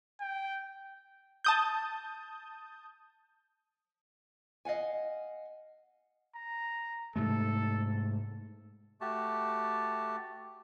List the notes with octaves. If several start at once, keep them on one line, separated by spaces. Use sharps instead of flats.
G5
A5 D#6 G6
D#5 F5 F#5 G#5
A#5
G#2 C3 A3 A4
A3 F#4 G4 A5